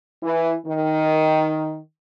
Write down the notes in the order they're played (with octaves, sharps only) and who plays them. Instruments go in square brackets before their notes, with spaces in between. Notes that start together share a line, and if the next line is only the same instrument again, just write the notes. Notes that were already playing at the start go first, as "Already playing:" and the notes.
[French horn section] E3
D#3